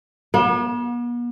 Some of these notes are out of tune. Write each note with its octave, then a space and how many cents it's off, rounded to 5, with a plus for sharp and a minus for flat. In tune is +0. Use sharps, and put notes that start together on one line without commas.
B3 -45